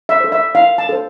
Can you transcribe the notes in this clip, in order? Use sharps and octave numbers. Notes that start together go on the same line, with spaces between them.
E5
A4 C5
E5
E4 F5
A5
A4 C5